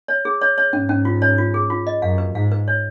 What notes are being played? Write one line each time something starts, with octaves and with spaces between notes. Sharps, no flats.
C#5
G#4
C#5
C#5
G#2 C#4
C#4
F4
C#5
F4
G#4
F4
D#5
F#2 F5
B4
G#2 F5
B4
C#5